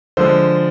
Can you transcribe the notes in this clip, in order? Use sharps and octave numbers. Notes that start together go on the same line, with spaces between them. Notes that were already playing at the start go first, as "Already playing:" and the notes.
D3 F3 G#3 C5